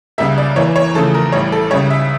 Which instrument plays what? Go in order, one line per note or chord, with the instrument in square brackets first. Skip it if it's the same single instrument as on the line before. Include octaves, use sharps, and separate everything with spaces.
[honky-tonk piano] C#2 C#3 G3 A#3 E5
D5
E2 E3 A#3 C#5
C#5
E2 C#3 F3 A3 A4
A#4
A1 A2 G3 C#5
A4
C#2 C#3 G3 C#5
E5